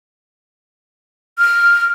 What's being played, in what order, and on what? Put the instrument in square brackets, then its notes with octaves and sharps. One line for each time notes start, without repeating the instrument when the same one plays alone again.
[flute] F6